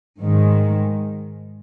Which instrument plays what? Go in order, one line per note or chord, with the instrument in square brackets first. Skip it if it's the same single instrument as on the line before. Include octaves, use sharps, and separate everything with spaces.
[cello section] G#2 D#3 G#3